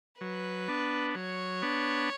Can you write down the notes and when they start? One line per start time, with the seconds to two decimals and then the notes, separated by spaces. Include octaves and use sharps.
0.20 F#3 B4
0.68 B3 D4
1.15 F#3 C#5
1.62 B3 D4